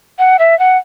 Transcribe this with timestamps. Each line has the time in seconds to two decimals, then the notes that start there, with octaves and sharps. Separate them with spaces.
0.19 F#5
0.39 E5
0.59 F#5